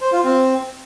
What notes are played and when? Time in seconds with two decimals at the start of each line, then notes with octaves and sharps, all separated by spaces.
0.01 C5
0.12 F4
0.24 C4